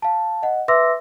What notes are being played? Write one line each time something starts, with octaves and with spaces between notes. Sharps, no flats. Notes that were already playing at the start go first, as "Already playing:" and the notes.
F5 A5
D#5 F#5
B4 E5 C6 D6 E6 A#6